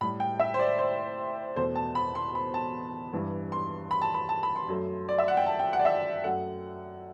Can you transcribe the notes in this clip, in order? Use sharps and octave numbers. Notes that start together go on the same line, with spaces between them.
A2 G3 B5
G5
E5
C5
D5
C5
E2 B2 A3 C5
A5
B5
C6
B5
A5
G2 E3 G3
C6
B5
A5
B5
A5
B5
C6
F#2 F#3 A3
D5
E5
F#5
G5
A5
G5
F#5
D5
E5
F#2 F#3 A3 F#5